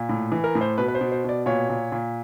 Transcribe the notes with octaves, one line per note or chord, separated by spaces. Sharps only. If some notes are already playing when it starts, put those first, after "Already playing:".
Already playing: A#2
A2
E3
A#4
A2
C5
B2 B4
B4
C5
B2
C5
B2 D5
A#2 C#5
A#2
A#2